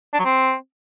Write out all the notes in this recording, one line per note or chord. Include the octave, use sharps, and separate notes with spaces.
D4
F#3
C4